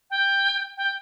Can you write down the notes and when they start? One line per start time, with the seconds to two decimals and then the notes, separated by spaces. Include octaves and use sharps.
0.10 G5
0.77 G5